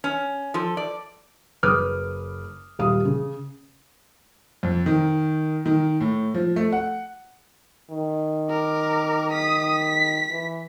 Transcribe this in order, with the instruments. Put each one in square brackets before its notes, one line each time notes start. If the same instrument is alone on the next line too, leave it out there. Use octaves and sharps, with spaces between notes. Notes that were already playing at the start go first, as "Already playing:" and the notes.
[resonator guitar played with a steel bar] C#4
F3 A4
D5
[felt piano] F#1 B4 D6 D#6 F6
D#1 G3 F5 D#6
C#3
[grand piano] F2
D#3
D#3
A2
F3
A3
F#5
[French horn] D#3
[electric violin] A#4 D6
D#6 B6
B6
[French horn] E3